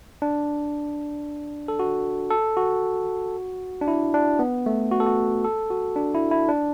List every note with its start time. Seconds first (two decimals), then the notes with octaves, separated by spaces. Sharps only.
0.22 D4
1.68 A4
1.79 F#4
2.30 A4
2.57 F#4
3.81 D4
3.88 E4
4.14 D4
4.39 B3
4.66 A3
4.92 F#4
5.00 A4
5.07 F#4
5.45 A4
5.70 F#4
5.96 D4
6.14 E4
6.31 E4
6.49 D4